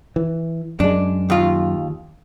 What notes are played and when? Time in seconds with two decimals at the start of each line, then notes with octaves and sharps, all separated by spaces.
0.16 E3
0.80 F#2 G#3 D4
1.30 D#2 F4